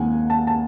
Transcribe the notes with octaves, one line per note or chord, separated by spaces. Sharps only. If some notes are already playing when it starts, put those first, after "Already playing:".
Already playing: D#2 D#3 G#3 C4 F#5 G#5
A5
A5